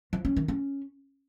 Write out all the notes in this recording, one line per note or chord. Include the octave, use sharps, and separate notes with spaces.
F3
C#4
D#3
C#4